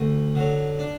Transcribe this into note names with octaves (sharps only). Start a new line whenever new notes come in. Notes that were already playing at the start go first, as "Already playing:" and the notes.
Already playing: D2
D3 F#3
D4